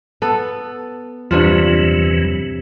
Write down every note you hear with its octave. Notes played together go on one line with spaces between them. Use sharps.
B3 A4
E2 G2 C3 E3 F#3 F4